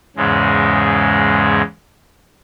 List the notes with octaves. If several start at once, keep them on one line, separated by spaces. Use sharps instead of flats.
E2 G#2 C#3 G#3